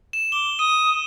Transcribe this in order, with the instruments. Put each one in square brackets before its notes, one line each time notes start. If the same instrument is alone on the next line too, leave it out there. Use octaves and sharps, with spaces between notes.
[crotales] E7
[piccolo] D6 [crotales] G7
[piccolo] D#6 [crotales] D#7